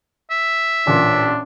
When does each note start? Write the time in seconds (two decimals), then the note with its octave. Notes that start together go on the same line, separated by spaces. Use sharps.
0.31 E5
0.87 A1 A#2 D4